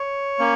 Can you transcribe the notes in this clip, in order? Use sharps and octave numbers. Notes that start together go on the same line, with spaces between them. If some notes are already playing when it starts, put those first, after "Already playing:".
Already playing: C#5
A#3 C#4